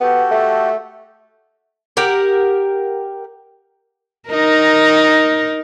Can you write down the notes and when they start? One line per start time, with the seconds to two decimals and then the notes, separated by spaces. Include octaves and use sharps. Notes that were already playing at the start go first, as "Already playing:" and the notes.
0.01 B3 F#4 G4 A4
0.31 A3
1.97 G4 A#4 F#5
4.29 D#4 A#4